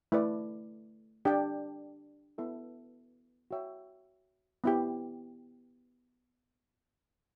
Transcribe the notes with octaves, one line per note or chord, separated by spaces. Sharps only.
A3 E4 B4 D5
D4 G4 D5 G5
B3 E4 A4 E5
F#4 C#5 E5 G5
B3 E4 G4